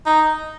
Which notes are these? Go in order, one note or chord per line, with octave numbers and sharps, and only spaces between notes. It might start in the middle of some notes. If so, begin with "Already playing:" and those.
D#4